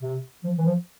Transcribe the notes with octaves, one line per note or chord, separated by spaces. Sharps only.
C3
F3
E3
F3